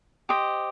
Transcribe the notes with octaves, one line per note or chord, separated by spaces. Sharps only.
G4 C5 D#5